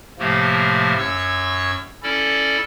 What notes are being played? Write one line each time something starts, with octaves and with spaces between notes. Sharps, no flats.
A2 C3 F3 A3 A#3
F#2 C#5 C#6 E6
C#4 E4 A4 D5